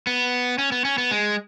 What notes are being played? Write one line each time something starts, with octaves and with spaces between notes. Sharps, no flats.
B3
C#4
B3
C#4
B3
G#3